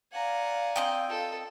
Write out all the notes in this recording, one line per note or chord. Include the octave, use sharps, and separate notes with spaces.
D5 F5 F#5 G#5 A#5
C4 D#5 G5
F4 A4